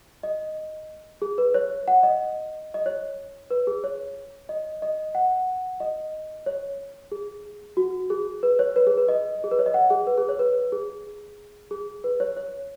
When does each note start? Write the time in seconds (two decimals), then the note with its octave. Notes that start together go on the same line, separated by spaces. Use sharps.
0.23 D#5
1.22 G#4
1.38 B4
1.54 C#5
1.88 F#5
2.03 D#5
2.74 D#5
2.86 C#5
3.50 B4
3.67 G#4
3.84 C#5
4.49 D#5
4.82 D#5
5.15 F#5
5.80 D#5
6.46 C#5
7.12 G#4
7.77 F#4
8.10 G#4
8.43 B4
8.59 C#5
8.76 B4
8.87 G#4
8.97 B4
9.08 D#5
9.44 G#4
9.51 B4
9.59 C#5
9.66 D#5
9.74 F#5
9.90 G#4
10.07 B4
10.17 G#4
10.29 C#5
10.39 B4
10.72 G#4
11.71 G#4
12.04 B4
12.20 C#5
12.37 C#5